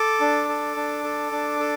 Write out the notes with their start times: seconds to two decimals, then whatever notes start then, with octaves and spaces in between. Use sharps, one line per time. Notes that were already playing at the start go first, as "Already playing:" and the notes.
Already playing: A4 D6
0.21 D4
0.49 A4
0.76 D4
1.04 A4
1.32 D4
1.60 A4